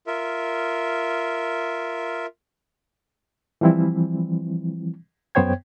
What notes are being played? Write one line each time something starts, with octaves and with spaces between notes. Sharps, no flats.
F4 A#4 E5
E3 F3 G3 C4 E4
F#2 B3 C5 C#5 G5 G#6